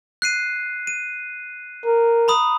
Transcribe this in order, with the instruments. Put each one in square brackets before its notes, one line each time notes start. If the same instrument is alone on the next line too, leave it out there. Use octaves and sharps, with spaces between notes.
[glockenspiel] F#6 C7 D#7
D#7
[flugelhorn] A#4
[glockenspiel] A#5 B5 D#6